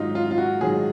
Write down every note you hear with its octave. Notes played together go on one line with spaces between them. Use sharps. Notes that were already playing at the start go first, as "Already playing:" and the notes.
Already playing: G#2 D#3 F#3 D#4 F4
F4
F4
F#4
G#2 D#3 F#3 G#4